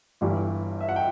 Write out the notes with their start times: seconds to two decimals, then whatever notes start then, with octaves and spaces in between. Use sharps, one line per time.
0.21 G1 G2 E3 G3
0.81 E5
0.89 F#5
0.96 G5